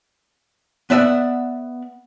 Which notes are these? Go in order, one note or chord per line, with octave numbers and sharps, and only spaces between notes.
B3 D5 E5 F#5